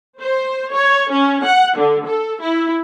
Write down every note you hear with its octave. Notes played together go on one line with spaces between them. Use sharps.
C5
C#5
C#4
F#5
D3
A4
E4